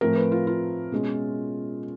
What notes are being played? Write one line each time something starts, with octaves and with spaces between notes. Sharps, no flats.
A2 F3 A3 C4 A#4
B4
F4
F4
B2 G#3 C#4